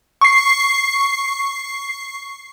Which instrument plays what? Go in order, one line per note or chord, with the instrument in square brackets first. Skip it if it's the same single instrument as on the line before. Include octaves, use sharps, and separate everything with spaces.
[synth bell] C#6 C7